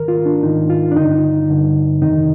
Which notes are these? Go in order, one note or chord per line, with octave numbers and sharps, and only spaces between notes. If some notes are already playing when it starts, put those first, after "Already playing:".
Already playing: G#2 D#3 A#4
F4
D4
G#2 D#3 D#4
F4
D4
G2 D3 D#4
G2 D3
F2 C3 D#3 D#4